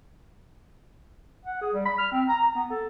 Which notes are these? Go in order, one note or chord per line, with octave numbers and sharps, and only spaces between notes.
F#5
G#4
G3
B5
F6
C4
A#5
A#5
B3
A4